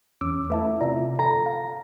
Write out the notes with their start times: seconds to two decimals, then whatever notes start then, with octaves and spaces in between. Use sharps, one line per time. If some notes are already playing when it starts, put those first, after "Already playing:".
0.21 E2 C#4 D6 E6
0.50 A3 E4 B4 E5 A5
0.81 C3 F4 D5 E5 A#5
1.19 A4 A#5
1.46 F5